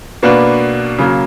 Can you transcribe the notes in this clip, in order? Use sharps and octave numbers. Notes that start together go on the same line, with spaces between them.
B2 A#3 D4 F#4 B4
C#3 F#3 A#3